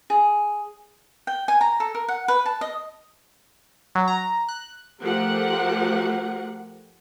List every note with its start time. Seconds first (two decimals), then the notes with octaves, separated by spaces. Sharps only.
0.10 G#4
1.27 G5
1.48 G#5
1.61 A#5
1.80 A4
1.95 A#4
2.08 F#5
2.28 B4
2.46 A5
2.61 D#5
3.95 F#3
4.08 A#5
4.49 F#6
5.01 F3 A3 G4 A#4 F#5